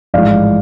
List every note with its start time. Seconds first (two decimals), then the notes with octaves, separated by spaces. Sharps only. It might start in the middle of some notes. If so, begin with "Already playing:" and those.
0.14 A1 G#2 F3 G#3 D5 F5